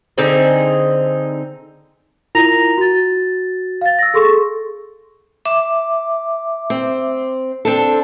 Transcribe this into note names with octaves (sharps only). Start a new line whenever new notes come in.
D3 C4 D#4 G#4
E4 F4 A#4 A#5 A#6 F7
F#4 A6
F5 A6
E6 A#6
G#4 A4 C6 C#6
E5 D6
C4
C4 D4 A4